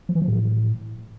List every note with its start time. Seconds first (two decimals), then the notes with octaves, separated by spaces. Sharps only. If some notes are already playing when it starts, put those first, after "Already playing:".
0.09 F3
0.15 E3
0.22 F3
0.28 A2